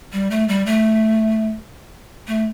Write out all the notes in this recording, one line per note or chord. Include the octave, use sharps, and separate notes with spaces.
G3
A3
G3
A3
A3